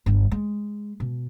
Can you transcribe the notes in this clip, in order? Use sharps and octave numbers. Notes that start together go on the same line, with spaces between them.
G1 G2
G#3
B2